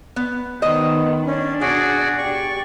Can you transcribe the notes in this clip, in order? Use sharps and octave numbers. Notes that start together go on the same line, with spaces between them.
B3
D#3 B3 C5 D#5
C#4 D4
B2 F#4 G#4 D5
G4 D5 C#6